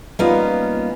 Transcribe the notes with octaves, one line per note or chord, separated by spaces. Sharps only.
G3 A#3 B3 C#4 D#4 F4